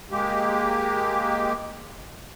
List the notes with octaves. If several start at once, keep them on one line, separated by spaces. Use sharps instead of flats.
G#3 A#3 G4